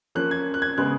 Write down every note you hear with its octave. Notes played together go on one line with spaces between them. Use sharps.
F3 A#3 C#4 F#6
G#6
F#6
G#6
C#3 G#3 B3 F#6